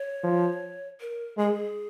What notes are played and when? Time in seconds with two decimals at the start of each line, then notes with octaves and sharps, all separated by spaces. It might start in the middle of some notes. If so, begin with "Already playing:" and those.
Already playing: C#5
0.24 F3
1.00 A#4
1.37 G#3 G#4